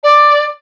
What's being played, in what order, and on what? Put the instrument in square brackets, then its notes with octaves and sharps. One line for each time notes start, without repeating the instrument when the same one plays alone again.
[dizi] D5